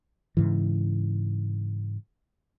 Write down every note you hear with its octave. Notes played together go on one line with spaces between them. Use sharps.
G#2 C#3 E3